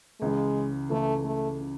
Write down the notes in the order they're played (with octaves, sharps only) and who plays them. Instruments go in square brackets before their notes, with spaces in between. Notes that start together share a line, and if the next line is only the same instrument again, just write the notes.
[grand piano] C#2 C#3 E3 [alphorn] G#3
[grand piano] C#2 C#3 E3 [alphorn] A3
[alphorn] A3
[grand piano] C#3